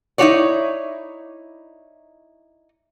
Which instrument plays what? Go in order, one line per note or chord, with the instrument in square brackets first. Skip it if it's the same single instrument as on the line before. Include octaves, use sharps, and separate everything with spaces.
[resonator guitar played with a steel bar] D#4 E4 F#4 G4 C#5 D5